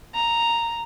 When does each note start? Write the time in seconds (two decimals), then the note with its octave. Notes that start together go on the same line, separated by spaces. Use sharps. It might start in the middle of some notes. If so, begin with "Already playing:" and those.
0.15 A#5